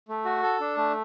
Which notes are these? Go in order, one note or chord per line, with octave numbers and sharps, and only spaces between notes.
A3
F#4
A4
D4
A3